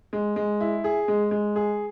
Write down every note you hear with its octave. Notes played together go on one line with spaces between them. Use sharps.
G#3
G#3
E4
G#4
G#3
G#3
G#4